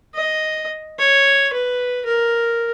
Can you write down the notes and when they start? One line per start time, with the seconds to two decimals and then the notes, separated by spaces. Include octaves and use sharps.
0.15 D#5
0.99 C#5
1.53 B4
2.05 A#4